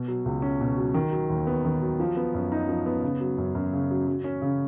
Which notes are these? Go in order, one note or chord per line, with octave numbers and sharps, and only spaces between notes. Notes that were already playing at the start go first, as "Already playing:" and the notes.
Already playing: B2
F#3
C#2
C#4
B2
F#3
D#3
F#3
D#2
B3
D#3
F#3
F3
B3
F#2
D#4
F3
B3
C#3
F#3
F#2
F#2
C#3
F#3
F#3
C#4
C#3